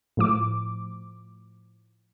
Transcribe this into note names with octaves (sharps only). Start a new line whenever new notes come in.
A2 F3 D6